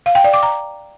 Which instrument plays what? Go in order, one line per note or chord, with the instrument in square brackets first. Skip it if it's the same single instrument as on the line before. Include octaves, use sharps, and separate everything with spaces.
[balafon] F5
G5
D5
D6
A#5